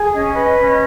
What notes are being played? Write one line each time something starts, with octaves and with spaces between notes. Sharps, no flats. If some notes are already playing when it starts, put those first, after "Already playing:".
Already playing: G#4
C#4 D#5
B4 D#5
C#4